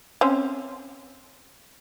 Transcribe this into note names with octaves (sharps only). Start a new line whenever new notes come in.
C4 C#4 C5